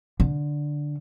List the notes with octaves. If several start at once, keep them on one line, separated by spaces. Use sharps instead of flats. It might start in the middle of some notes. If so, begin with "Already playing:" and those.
D3